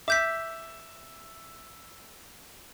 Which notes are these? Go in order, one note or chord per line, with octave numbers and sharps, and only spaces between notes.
E5 D6 E6 G6 B6